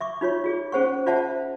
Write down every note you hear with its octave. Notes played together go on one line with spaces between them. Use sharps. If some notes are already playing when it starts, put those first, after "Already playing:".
E5 C#6 D6
D#4 F4 C#5 C#6
F4 G#4 D5
C#4 G#4 C5 F#5 C#6
F4 C5 D5 E5 F#5 A5